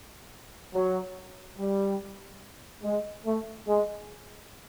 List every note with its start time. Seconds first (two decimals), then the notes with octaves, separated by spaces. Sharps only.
0.74 F#3
1.58 G3
2.84 G#3
3.26 A3
3.68 G#3